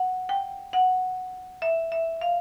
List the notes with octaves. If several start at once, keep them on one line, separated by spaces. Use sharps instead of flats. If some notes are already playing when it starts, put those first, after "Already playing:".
Already playing: F#5
G5
F#5
E5
E5
F5